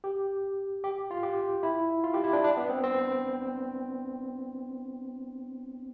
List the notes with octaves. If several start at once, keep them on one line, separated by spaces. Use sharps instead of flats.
G4
G4
F4
G4
E4
F4
G4
E4
D4
D4
B3
C4
C4